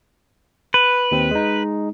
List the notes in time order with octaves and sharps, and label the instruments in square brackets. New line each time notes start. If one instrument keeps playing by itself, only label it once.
[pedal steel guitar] B4
[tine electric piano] D#2 C4
G#3 D#4